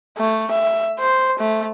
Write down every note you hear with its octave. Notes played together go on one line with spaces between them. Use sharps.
A3
E5
C5
A3